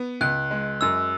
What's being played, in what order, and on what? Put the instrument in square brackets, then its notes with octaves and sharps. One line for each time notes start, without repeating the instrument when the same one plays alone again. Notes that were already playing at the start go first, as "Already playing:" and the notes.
Already playing: [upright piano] B3
[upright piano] C#2 [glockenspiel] F#6
[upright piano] G#3
[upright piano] F#2 [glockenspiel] E6